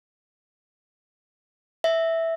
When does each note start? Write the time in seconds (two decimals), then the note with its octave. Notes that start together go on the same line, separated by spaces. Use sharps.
1.84 E5